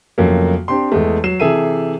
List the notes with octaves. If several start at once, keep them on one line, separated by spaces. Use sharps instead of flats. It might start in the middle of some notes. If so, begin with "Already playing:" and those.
F2 C#3 F#3 A3 A#3
C4 D4 G4 C6
E2 G#3 A3
F#3 C7 E7
C3 E3 G#4 A4 E5 D#7